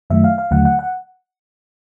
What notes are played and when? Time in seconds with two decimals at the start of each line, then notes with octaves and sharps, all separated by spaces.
0.10 F#2 D#3 F#3 A3 E5
0.24 F5
0.38 F5
0.51 D#2 D3 F#3 A3 F#5
0.65 F#5
0.79 F#5